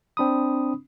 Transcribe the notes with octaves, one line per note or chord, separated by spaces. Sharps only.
C4 D4 B5 D#6